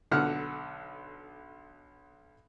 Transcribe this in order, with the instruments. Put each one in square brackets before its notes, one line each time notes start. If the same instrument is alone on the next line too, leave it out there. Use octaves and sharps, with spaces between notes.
[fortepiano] B1 D3 F#5 F6